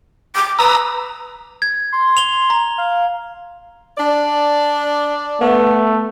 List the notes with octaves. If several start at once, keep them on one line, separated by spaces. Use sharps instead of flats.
D6
B4 A#5 D#6 E6
G#6
C6
F7 G7
A#5
F5
D4 D5
A3 B3